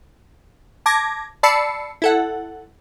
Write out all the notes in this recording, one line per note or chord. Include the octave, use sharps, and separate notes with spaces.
A5 D6 G#6 A#6
D5 A5 B5 E6 C7 C#7
E4 A4 F#5